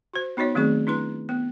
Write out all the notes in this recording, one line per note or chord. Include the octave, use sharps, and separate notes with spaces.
F#4 C5
B3 D#4 F#4 C#5 D#5
D#3 F#3 A3 C4 G#4 C#6
D4 E4 B4 C6
B3